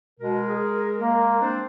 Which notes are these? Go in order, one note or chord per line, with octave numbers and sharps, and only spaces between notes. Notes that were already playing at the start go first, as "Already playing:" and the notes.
B2 G#3 A#4
G#4
A#3
C4 D4 C5